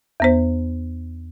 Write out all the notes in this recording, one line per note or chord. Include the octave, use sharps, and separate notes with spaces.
E2 B3 C5